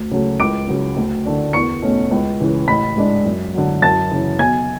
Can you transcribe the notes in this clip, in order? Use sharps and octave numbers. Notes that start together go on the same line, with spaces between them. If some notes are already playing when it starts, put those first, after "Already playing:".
Already playing: D2
C#3 F#3 A3
C#2 D6 D7
C#3 F#3
D2
D3 A3 D4
E2 C#6 C#7
B2 A3 C#4
C#2
C#3 E3
A1 B5 B6
G#2 G#3 D4
F#2
D3 F#3
F#2 A5 A6
C#3 E3
B1 G#5 G#6